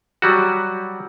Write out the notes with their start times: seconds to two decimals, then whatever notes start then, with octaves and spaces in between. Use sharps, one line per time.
0.22 F#3 G3 F#4